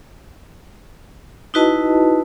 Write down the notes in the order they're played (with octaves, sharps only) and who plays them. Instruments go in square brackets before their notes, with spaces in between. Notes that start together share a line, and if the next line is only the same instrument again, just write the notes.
[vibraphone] D#4 E4 F#4 B4 D#5 A5